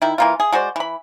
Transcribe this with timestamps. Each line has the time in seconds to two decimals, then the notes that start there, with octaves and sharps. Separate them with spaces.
0.02 D#3 E4
0.18 E3 A#3 F4
0.40 G#4
0.52 G#3 F#4 C5 D5
0.76 E3 B5